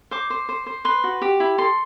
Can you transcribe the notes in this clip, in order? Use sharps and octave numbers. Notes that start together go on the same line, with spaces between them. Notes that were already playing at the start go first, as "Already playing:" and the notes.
C5 D6
C5
C5
C5
B4 C6
F#4
G4
E4
A4 C6